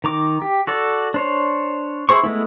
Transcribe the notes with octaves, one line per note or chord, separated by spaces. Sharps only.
D#3 A#5 D6
G4
F#4 A4 D5
D4 C5 C#5
E4 G#4 C5 C#6
G#3 A3 B3 E4